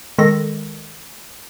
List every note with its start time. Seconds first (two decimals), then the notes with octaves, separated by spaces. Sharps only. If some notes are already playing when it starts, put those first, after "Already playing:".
0.18 D#3 G#3 A4 A#6